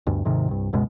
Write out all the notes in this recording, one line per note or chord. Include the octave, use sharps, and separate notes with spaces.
D2 G2
D#2 G#2 C3 D#3
C2 G2
C#2 F#2 B2 G#3